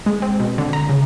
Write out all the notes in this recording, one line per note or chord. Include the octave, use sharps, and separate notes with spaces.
G#3
C4
B2
D3
A#5
C#3